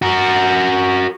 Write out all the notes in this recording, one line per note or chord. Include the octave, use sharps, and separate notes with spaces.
F#4 A#4